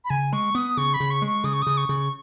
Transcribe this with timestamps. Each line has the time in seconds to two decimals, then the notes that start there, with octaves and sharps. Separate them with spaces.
0.05 B5
0.10 C#3 G#5
0.33 G#3 C#6
0.55 B3 D#6
0.77 C#3 C#6
0.94 B5
1.00 C#3
1.10 C#6
1.22 G#3
1.27 C#6
1.44 C#3 D#6
1.54 C#6
1.62 C#3 D#6
1.77 C#6
1.89 C#3